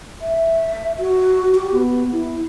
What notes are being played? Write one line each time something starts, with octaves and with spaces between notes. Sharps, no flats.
E5
F#4
G4
B3
E4